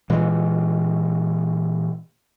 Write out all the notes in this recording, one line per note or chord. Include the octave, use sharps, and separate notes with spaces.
A#2 E3 G#3